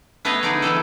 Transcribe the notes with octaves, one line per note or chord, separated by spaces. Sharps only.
A3 B3 G#4 B4 C#5 D#5
D3 D#4 G#4 D5
E3 G3 A4